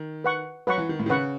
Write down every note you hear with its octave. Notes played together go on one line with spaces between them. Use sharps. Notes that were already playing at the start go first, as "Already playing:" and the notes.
Already playing: D#3
B4 F#5 C#6
F#3 B4 F#5 C#6
E3
D#3
A2
D#3
C#3 B4 F#5 C#6